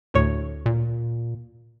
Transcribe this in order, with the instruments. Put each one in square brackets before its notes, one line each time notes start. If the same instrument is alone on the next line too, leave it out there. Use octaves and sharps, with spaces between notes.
[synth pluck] D2 A2 C#5
[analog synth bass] A#2